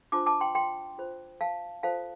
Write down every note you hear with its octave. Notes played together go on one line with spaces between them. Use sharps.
D4 F4 C5 A5 D6
A5 D6
G5 C6
G5 C6
F4 C5
F5 A5
F4 A4 C5 F5 A5